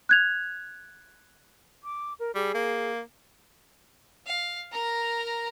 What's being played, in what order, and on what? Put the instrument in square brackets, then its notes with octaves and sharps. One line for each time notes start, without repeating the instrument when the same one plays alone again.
[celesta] F#6 G#6 F7
[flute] D6
A#4
[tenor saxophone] G3 [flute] G#4
[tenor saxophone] A#3
[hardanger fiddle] F5
A#4 A#5